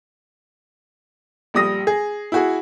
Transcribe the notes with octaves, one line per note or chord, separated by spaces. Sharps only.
A#1 G3 D#6 A#6
G#4
E4 F#4 G#4